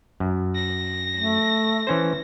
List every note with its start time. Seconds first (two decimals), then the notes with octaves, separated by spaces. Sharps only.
0.20 F#2
0.55 A#6
1.16 A3
1.87 E3 C#4 C5